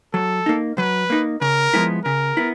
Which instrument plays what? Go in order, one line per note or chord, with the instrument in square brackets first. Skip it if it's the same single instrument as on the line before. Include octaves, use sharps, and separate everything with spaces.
[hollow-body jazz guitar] F#3 [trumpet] A4
[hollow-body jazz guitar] A#3 D#4
[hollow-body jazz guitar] F#3 [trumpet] B4
[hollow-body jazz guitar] A#3 D#4
[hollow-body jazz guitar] C#3 [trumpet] A#4
[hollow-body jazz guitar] F3 G#3 B3 E4
[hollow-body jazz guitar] C#3 [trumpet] A#4
[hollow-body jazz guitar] B3 E4